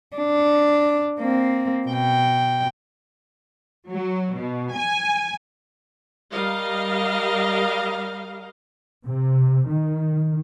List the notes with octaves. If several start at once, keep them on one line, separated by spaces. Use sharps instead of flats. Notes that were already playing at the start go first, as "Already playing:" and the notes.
D4
A#3 C4
B2 G5
F#3
B2
G#5
G3 A#4 D#5 F5
C3
D#3